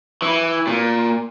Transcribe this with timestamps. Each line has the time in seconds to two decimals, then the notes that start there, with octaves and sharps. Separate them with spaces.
0.22 E3
0.67 A#2